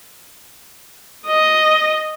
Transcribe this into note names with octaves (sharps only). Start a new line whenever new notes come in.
D#5